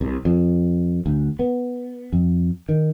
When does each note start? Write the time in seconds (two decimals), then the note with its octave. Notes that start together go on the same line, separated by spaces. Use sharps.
0.01 C2
0.25 F2
1.06 D2
1.39 B3
2.13 F2
2.69 D#3